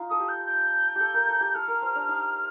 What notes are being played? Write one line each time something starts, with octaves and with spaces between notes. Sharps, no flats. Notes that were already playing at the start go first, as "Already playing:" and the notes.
Already playing: D#4 F4
A4 D#6
G4
G6
G6
G4 A4
A#4
A4
G4
A4 F6
A#4
C5
D4
D#4